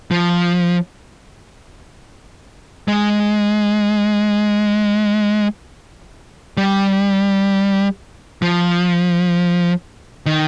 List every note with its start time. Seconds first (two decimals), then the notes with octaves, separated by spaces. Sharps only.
0.11 F3
2.88 G#3
6.57 G3
8.42 F3
10.26 D#3